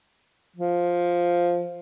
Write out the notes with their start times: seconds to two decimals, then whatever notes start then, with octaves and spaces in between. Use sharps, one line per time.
0.56 F3